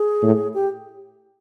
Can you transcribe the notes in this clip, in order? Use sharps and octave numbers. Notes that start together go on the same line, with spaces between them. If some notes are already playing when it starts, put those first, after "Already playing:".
Already playing: G#4
A2
G4